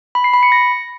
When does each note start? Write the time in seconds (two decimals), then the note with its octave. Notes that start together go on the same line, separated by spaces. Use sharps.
0.15 B5
0.24 C7
0.34 B5
0.43 C#7
0.52 A#6